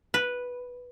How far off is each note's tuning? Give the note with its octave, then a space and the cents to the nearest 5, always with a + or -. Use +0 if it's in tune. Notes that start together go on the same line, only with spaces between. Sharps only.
B4 -5